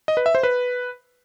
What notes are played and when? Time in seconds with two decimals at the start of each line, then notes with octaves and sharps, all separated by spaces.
0.08 D#5
0.17 B4
0.26 E5
0.35 C5
0.43 B4